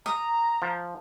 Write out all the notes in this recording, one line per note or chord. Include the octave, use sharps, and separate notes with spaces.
A#5 D#6
F3